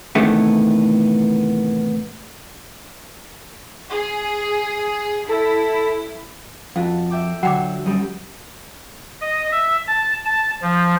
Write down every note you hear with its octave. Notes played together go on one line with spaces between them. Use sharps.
A2 C3 D#3 E3 A3 B3
G#4
E4 A4
F2 F4 F#4 A4 F5
E5 G5 D6
D3 F#3 F#5 G5 D6 E6
F#2 G3 D#6
D#5
E5
A5
A5
F3